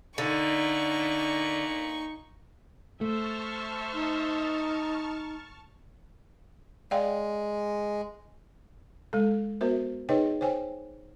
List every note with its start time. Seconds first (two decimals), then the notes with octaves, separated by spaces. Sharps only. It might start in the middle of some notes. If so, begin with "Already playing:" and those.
0.18 A#2 D3 D#4 C#6
3.01 A3 C5 E5 A5 C#6 F6
3.93 D#4
6.91 G#3 D5 F5 G5
9.13 G#3 A4
9.61 B3 F#4 A#4 C5 E5
10.09 D#4 G#4 B4 C#5 D#5 G5
10.41 C5 C#5 G5 G#5